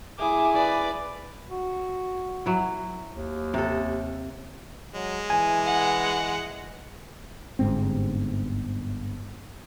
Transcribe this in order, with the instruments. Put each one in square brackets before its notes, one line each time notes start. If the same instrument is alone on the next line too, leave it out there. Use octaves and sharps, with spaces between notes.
[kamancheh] E4 G#4 [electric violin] D6
[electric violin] B4 D5
[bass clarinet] F#4
[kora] F#3 E4
[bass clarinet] D#2
[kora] C3 A4
[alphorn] F#3 [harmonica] G#3
[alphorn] E3 [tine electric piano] G#5
[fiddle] F#5
[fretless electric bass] G1 G#2 C4